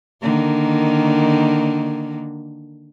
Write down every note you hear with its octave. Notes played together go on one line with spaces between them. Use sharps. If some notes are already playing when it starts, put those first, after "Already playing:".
D3 D#3 A#3